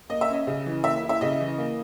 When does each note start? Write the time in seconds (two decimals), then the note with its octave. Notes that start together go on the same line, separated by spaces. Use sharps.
0.10 A#3 D#5
0.21 E5
0.29 C#4 D#5
0.47 C#3
0.66 E3
0.84 A#3 E5
1.03 E4
1.09 E5
1.21 C#3 D#5
1.41 E3
1.58 A#3